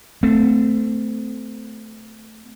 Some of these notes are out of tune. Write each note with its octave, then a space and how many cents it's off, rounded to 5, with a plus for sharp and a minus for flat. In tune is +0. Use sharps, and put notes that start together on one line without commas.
A3 +0 C4 -30